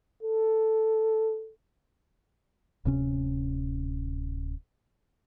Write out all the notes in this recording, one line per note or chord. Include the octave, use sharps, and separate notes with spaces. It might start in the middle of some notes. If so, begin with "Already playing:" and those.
A4
D1 C3 C#4